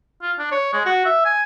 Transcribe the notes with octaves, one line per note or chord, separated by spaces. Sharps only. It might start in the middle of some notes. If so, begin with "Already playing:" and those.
F4
D4
C#5
G#3
F#4
E5
G#5